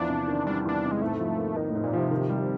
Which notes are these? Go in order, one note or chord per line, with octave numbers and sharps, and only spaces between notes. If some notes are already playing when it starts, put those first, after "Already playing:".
Already playing: E2 F3 D4
C3
D#3
G3 D4
E2 D4
C3
G#3
G#2 A3
F3
A#3
D#3 D#4
A2
G#2
A#2
C3 F3
D#3
G3